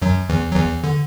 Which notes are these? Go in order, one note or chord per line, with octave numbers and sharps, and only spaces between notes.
F#2 F#3
E2 E3
F#3
E2 E3
D3